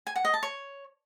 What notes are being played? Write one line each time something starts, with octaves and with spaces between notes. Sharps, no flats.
G#5
F#5
D#5
A5
C#5